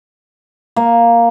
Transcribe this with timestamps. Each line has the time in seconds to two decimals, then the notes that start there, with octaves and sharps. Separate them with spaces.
0.76 A#3